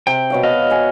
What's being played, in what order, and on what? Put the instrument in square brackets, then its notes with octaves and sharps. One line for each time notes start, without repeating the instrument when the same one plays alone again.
[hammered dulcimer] C3 [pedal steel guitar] G5
[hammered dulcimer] B2 C#5 F5
[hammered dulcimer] B2 [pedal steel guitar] B4 D#5 F5
[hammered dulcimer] F#5 G#5